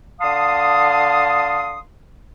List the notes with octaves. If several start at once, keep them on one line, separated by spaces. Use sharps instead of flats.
D3 F5 A5 C6 D#6